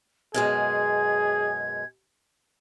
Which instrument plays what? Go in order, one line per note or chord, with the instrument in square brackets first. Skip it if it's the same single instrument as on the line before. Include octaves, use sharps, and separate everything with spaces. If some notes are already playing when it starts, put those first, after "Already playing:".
[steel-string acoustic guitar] F#2 B2 G#3 [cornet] G#4 [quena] G#6